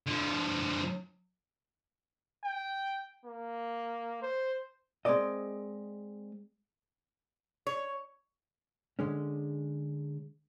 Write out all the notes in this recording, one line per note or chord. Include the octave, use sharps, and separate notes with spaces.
D3 F3
G5
A#3
C5
G#3 C4 A#4 D5 D#5
C#5
D3 G#3 C#4